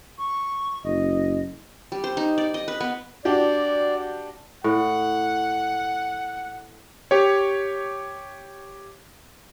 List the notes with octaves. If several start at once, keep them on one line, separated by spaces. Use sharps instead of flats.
C#6
F#1 D#5
G3
C5
D#4
D5
D#5
B4
B3
D4 F#4 G4 D5
A2 F#5
G4 C#5